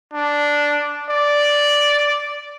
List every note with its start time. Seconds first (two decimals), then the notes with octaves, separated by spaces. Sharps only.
0.13 D4
1.10 D5